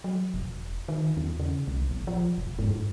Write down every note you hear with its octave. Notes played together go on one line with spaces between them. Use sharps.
F#3
E1
D#3
E2
C#3
C2
A#1
F3
E1
G#2
G2